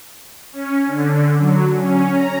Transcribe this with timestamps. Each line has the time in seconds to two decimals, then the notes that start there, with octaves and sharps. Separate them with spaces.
0.52 C#4
0.86 D3
1.39 F#3
1.75 C#4
2.10 A#5